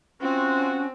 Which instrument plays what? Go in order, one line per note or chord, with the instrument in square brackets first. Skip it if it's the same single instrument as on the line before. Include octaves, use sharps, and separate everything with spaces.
[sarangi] C4 [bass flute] C#4 [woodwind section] F4 F#4